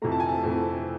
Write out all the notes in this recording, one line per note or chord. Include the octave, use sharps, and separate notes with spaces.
F2 C3 E3 A3 A#5
A5
G#5
A5
F2 C3 E3 A3